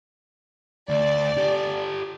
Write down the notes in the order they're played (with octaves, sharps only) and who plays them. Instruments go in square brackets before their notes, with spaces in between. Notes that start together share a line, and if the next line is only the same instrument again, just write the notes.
[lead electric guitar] D2 [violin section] D5
[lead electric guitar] G4 A4